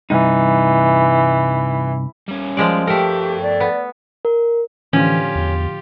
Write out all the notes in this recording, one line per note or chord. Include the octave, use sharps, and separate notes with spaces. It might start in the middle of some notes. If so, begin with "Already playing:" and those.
C2 G2 E3 D#4
G3 C#4
F3 G#3 D5
A3 G4 A4 A#4 G5
D5
B3
A#4
A2 D3 E3 F3 C#4 F4 G4
E2